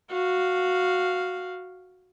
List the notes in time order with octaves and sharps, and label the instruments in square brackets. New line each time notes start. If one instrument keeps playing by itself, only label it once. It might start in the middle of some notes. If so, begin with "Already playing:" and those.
[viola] F#4 F5